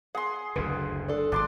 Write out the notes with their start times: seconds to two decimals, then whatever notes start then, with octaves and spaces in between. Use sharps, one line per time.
0.15 G#4 F#5 C6
0.56 F#1 D2 D3 B4
1.08 D4 A4
1.32 G#1 D4 C6 D6